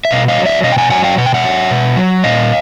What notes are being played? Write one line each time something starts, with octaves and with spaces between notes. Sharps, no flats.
E5
B2 D#5 F5
D#5 F5
F#3
D5 E5
B2 D#5 F5
G5
F#5 G#5
F#3 F#5 G#5
F5 G5
B2 F#5
G5
E5 F#5
F#3
B2
F#3
A#2 D#5 F5